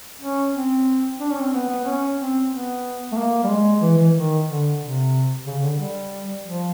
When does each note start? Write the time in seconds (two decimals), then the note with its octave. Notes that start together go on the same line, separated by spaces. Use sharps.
0.21 C#4
0.54 C4
1.20 D4
1.30 C#4
1.41 C4
1.53 B3
1.69 B3
1.84 C#4
2.18 C4
2.51 B3
3.11 A3
3.17 A#3
3.44 G3
3.49 G#3
3.81 E3
3.98 E3
4.15 D#3
4.47 D3
4.81 C3
5.46 C#3
5.63 D3
5.78 G3
6.44 F3